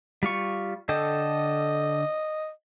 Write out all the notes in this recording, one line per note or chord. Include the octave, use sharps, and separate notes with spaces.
G3 F4 C#6
D3 A4 D#5 G5